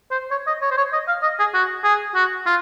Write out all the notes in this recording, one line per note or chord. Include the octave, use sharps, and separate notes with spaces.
C5
C#5
D#5
C#5
C5
C#5
D#5
F5
D#5
G#4
F#4
G#4
F#4
F4